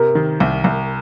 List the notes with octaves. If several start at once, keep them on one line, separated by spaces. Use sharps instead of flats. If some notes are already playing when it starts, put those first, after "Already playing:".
Already playing: C3 A#4
D#3
C2
C2